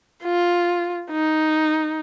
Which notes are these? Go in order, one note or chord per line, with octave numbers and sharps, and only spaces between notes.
F4
D#4